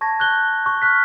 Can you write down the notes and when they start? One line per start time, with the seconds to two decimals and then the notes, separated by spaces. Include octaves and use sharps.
0.01 A5 C#6 G#6 A#6
0.20 F#6 G6 G7
0.66 C#6
0.82 F6 F#6 B6